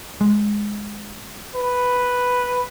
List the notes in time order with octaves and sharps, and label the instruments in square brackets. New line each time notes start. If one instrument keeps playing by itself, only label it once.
[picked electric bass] G#3
[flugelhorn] B4